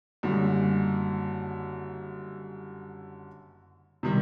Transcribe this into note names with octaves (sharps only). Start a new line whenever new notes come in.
F#1 F#2 D3 G3
C3 D#3 G3